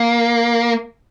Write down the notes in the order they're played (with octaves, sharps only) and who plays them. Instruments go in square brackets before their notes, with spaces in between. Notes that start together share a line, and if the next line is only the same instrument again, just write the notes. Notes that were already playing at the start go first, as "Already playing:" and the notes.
Already playing: [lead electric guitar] A#3